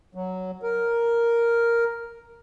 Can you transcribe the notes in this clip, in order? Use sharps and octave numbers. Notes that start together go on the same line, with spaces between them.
F#3
A#4